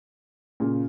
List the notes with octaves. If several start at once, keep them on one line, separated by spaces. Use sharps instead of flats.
A#2 C#3